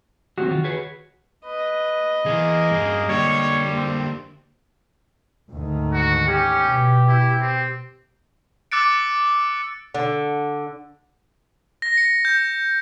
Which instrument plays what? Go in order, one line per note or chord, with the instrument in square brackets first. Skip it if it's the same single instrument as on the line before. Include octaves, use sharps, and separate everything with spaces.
[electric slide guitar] F#3 G3 C4 [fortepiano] F#4
[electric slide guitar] D#3 F4
G#4 B4 C#5
[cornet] B4 [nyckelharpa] D#5
[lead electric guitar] E3 B3 [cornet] A#3 [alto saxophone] G#4
[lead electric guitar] G2 C#4
[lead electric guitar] D3 A#3 [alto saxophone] G3 [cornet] C#5
[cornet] C4
[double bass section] D2 G#2 D#3
[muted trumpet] F#4
[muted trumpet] C#4 [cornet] G4
[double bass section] B2
[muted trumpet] E4
C4
[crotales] D6 E6 F#6 A6 C#7 D7
[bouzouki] D3
[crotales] A#6
C#7
G6